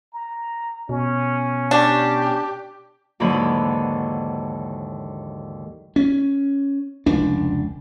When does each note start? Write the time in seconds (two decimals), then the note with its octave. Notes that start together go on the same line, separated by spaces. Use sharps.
0.13 A#5
0.89 B2 C#4
1.71 D4 G4
3.20 D#2 G#2 D3 E3 F#3 B5
5.96 C#4
7.06 F1 C#2 D4